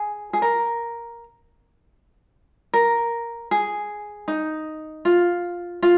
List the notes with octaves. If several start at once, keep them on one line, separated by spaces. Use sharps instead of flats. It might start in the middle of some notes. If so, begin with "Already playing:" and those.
Already playing: G#4
G#4
A#4
A#4
G#4
D#4
F4
F4